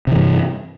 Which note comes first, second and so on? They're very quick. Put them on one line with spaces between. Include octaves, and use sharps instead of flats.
C3 E3 G2